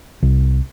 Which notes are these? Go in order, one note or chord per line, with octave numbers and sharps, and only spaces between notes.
C2